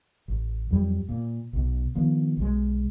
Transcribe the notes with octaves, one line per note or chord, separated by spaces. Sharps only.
A1
F2 F#3 G3
A#2
B1 B2
D#3 F3 B3
B1 G#3